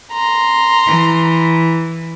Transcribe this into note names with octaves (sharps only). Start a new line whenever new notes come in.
A#5 C6
E3